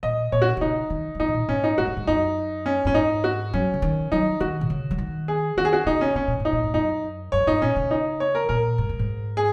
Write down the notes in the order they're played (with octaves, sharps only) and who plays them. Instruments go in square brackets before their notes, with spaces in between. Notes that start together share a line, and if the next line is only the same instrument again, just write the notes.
[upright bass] A#2 [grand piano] D#5
[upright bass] A#2 [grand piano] C#5
[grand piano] F#4
[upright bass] A#2
[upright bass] C#3 [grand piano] D#4
[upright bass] D#3
F#3
[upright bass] D#3 [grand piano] D#4
[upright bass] G#2
A#2
[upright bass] G#2 [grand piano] C#4
[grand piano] D#4
[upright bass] G#2 [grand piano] F#4
[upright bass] F#2
G#2
[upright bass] F#2 [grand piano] D#4
[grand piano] C#4
[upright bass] F#2 [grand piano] C#4
[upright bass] G#2 [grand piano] D#4
[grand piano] F#4
[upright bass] F#3 [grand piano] C#4
[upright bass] C#3
D#3
[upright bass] F#3 [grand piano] D#4
[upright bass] D#3 [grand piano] F#4
[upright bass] A#2
C#3
F#3
D#3
[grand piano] G#4
[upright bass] D#3 [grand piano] F#4
[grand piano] G#4
F#4
[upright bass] C#3 [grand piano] D#4
[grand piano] C#4
[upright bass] C#3 [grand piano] C#4
[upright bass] A#2
G#2
[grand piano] D#4
[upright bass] A#2
G#2
[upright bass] F#2 [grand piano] D#4
[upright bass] F#2 [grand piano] C#5
[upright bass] G#2 [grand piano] D#4
[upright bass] A#2 [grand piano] C#4
[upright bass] C#3
[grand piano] D#4
C#5
A#4
[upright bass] A#2 [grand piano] A#4
[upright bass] G#2
F#2
G#2
[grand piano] G#4